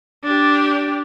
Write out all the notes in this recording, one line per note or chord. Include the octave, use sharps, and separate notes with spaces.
D4 G4